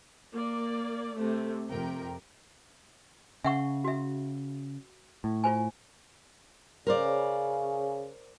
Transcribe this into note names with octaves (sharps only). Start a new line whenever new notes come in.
A#3 D5
C3 A3
F2 C3 A#4 G5
C#3 E5 F#5 C#6
F#4 E5
A2
F4 C5 G#5
C#3 A#4 C5 D5